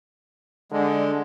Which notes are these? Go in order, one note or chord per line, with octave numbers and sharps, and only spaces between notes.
D3 G#3 D4